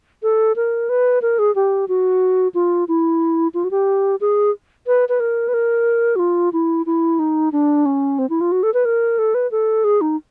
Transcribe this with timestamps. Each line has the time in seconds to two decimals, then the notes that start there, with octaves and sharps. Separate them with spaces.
0.23 A4
0.56 A#4
0.89 B4
1.22 A#4
1.39 G#4
1.55 G4
1.88 F#4
2.55 F4
2.88 E4
3.54 F4
3.64 F#4
3.71 G4
4.21 G#4
4.87 B4
5.09 B4
5.20 A#4
5.48 B4
5.54 A#4
6.16 F#4
6.19 F4
6.53 E4
6.86 E4
7.19 D#4
7.52 D4
7.86 C#4
8.19 C4
8.30 E4
8.41 F4
8.52 F#4
8.63 A4
8.74 B4
8.85 A#4
9.18 A4
9.34 B4
9.51 A4
9.84 G#4
10.01 D#4